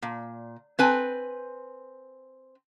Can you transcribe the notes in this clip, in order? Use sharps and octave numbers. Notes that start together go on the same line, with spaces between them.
A#2
C4 B4 G#5